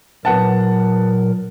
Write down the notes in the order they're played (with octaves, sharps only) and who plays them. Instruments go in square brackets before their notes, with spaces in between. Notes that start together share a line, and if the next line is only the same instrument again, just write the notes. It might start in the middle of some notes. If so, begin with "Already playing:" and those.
[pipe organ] A#2 F#3 A#4 [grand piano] B3 F#5 A5